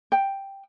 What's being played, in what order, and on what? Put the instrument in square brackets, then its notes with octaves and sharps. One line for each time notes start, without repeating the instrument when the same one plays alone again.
[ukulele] G5